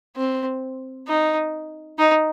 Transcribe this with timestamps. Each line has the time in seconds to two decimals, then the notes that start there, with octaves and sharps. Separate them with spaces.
0.16 C4
1.08 D#4
1.98 D#4